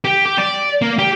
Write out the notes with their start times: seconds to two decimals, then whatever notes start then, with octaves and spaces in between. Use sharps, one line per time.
0.05 G4
0.26 G4
0.38 D5
0.82 A#3
0.99 G4